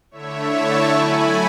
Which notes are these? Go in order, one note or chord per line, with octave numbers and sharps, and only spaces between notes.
D3 A3 E4 C#5 E5
A5 C#6
F#3 A3 E4 G#5 B5